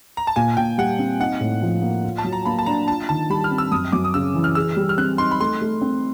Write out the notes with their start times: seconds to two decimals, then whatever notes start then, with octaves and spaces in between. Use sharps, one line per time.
0.17 A#5
0.27 A5
0.36 A#2 G#5
0.57 A#2 G5
0.78 G3 F#5
0.99 C4
1.19 D#4 F#5
1.40 A2
1.63 F3
1.82 A#3
2.04 F4
2.18 A5
2.24 F#3
2.33 A#5
2.45 A#3 B5
2.59 A5
2.66 D4 A#5
2.88 F4 A5
3.09 D#3 A5
3.30 G3 B5
3.44 F6
3.51 C4
3.58 E6
3.71 F#2 D#6
3.92 F#2 D6
4.04 D#6
4.14 C#3 E6
4.35 E3
4.44 F6
4.55 G#4 E6
4.77 G3
4.89 F6
4.98 C4 F#6
5.18 D#4 C6
5.31 B5
5.40 A3 C6
5.62 A3
5.82 C4